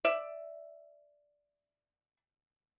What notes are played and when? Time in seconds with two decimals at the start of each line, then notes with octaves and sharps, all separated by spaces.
0.05 D5 E5